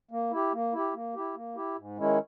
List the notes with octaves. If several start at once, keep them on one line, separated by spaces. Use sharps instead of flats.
A#3
E4 G4
A#3
E4 G4
A#3
E4 G4
A#3
E4 G4
G#2
D#3 G#3 C#4 E4